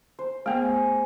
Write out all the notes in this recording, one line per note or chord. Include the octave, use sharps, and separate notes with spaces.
C5
A3 B3 G#4